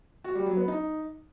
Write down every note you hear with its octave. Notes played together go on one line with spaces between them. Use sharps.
F#4
G3
F#3
B3
D#4